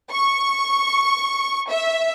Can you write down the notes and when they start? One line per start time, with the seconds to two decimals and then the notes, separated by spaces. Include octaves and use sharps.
0.11 C#6
1.70 E5